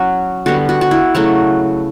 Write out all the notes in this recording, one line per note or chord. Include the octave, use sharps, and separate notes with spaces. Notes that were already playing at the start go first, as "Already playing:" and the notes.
Already playing: F#3 C#4 F#4
D3 G3 B3 F#4
F#4
F#4
E4
C#3 F#3 A3 F#4